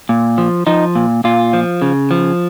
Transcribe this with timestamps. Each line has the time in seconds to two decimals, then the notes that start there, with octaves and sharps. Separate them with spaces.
0.09 A#2
0.38 F3
0.67 F3 D#4
0.95 A#2
1.24 A#2 F4
1.53 F3
1.82 C#3
2.11 F3